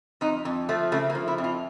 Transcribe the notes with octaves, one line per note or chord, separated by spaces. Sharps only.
F2 D#4
F2
F3 A3
C#3 A3
A#3
F3
E4
F2
F4